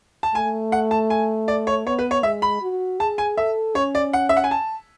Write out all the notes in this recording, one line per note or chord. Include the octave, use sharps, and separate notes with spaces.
A5
A3 G#5
F#5
A5
G#5
D5
C#5
B3 C#5
B4
C#5
G#3 E5
B5
F#4
G#4 A5
G#5
A4 E5
C#4 C#5
D5
F#5
E5
F#5
G#5
A5